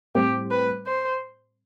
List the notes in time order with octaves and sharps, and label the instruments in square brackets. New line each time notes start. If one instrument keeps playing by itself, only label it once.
[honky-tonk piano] A2 G3 C4 [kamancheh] G4
[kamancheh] B4
C5